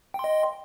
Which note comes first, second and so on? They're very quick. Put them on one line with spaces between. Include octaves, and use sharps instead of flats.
G5 C6 D#5